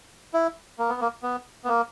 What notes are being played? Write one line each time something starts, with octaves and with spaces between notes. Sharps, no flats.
E4
A#3
B3
A#3
B3
B3
A#3